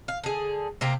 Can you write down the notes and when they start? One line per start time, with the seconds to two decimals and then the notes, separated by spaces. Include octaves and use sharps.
0.08 F5
0.24 D3 G#4
0.81 C3 A#3 C4